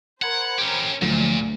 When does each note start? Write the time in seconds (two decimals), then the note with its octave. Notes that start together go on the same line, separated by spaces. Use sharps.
0.22 A#4 C5 F#5 B5 G#6 C#7
0.58 C#4 G4
1.02 D2 A#2 D3 F3 F#3